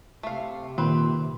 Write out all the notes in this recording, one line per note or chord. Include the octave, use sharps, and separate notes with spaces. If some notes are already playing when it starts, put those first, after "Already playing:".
C3 A3 F5
A#2 D#3 C4 B4